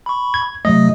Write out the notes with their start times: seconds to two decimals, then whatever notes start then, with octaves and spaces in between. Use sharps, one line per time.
0.06 B5 C#6
0.34 G#6
0.65 C3 F#3 A3 D#5